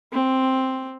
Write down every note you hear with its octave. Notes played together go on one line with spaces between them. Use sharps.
C4